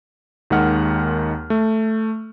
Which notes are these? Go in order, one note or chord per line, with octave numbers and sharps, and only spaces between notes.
D#2 D#3 G#3 F#5 F6
A3